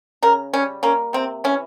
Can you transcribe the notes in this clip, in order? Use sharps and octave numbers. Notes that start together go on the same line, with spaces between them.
C#3 A#4
G3 C#4
A#3 C#4
C3 C4
E3 C#4